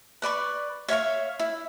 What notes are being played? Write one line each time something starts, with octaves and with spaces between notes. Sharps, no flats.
B4 D5 B5 C#6
C#5 E5 F5 C#6
E4